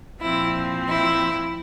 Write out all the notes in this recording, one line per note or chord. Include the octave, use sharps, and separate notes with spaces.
A#2 F3 C4 E4
E4